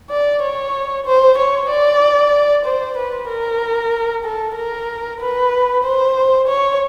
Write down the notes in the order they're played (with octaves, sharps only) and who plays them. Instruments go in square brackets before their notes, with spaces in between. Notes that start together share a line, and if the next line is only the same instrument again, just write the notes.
[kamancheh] D5
C#5
C5
C#5
D5
C5
B4
A#4
A4
A#4
B4
C5
C#5